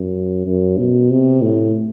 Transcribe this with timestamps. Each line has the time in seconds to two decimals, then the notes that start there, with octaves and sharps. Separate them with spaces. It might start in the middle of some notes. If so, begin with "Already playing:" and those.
Already playing: F#2
0.46 F#2
0.78 B2
1.11 C3
1.42 A2